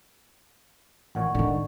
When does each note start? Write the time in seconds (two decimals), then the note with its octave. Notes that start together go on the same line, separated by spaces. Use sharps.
1.15 A1 A#2 C#5 F#5 C#6
1.35 A2 D3 D#3 A#3